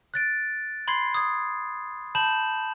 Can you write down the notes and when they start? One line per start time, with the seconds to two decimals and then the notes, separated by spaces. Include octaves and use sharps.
0.14 F#6 A6 D7
0.88 B5 C6 G#6 C7
1.14 D#6 G#6
2.15 A5 B5 G6 E7 F#7